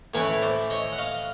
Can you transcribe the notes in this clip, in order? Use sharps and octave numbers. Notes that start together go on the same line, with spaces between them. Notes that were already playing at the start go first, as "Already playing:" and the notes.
A2 E3 A3 C#4 E4 B4 C#5
C5 D5
C#5 D#5
F#5
D#5 F5